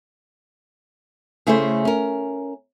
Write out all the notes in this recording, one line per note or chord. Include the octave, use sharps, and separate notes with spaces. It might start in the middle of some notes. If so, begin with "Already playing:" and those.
C#3 A3 E4 G#4 A4 C5
C#4 A#4